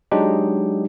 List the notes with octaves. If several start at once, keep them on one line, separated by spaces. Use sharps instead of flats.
F#3 G#3 D4 D#4 G4